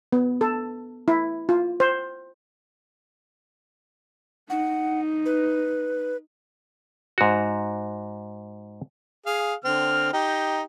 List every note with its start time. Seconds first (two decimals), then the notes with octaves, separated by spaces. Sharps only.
0.12 B3
0.41 A4
1.08 E4
1.49 F4
1.80 C5
4.50 D#4 F#5
5.25 B4
7.18 G#2 F#4
9.26 G#4 F5
9.65 D3 C4 F6
10.13 D#4 G4